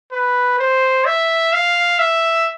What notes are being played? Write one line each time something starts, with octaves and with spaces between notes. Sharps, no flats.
B4
C5
E5
F5
E5